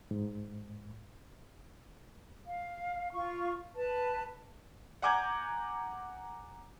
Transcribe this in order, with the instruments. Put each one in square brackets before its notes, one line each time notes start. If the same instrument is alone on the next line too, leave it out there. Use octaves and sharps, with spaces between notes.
[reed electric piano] G#2
[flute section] F5
F4 C#6
B4 A5
[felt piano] F#5 G#5 A#5 D6 G6 G#6